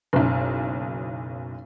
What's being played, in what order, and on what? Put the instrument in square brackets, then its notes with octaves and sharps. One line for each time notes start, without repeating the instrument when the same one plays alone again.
[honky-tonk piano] F#1 B1